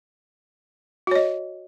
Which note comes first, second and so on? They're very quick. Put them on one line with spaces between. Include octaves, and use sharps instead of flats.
F#4 C#5 D#5